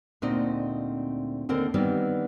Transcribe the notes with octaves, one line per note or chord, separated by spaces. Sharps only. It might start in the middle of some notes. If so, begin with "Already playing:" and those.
D2 A#2 A3 C4 D#4 D#5
D#2 D3 C4 A#4 C5
D#3 E3 G3 B3 C4